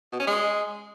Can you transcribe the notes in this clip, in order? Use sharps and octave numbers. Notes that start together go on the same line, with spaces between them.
B2
C#4
G#3